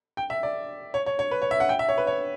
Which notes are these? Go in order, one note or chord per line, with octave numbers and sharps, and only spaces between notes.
G5
E5
D5
C#5
C#5
C#5
B4
C#5
E5
F#5
G5
E5
C#5
B4
C#5